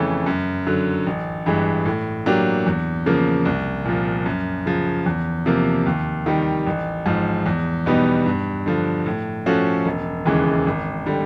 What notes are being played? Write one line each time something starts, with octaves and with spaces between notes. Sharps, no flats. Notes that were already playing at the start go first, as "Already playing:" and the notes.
Already playing: F2 C#3 E3 A3 C#4
F#2
D3 F#3
A1
G2 E3 G#3
A2
F#3 A#3 D4 G4
E2
C#3 F3 A#3
C2
A#2 F3
F#2
C#3 F3
E2
C3 F3 A#3
D#2
D#3 G3
A1
G#2 F3
E2
B2 G3 B3 D#4
G2
D3 F3
A2
F3 A3 C#4 F#4
E1
D#2 C#3 E3 G#3
G#1
D3 G3